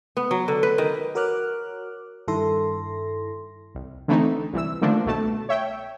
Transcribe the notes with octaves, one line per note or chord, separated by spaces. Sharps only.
B3
F#3
D3
B4
D#3
F#4 A#4 C#5 D6 F6 F#6
G2 D#3 E4 A4 C6 A#6
C2
D3 E3 A3 C4 D#4
C2 E3 E6
D3 D#3 F3 A3 A#3 D4
C2 B2 A3 A5
C#5 E5 G5